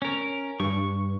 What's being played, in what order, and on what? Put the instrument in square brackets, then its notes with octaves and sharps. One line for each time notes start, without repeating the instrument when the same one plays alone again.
[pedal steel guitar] C#4 A#4
[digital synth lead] G2 [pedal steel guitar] C#6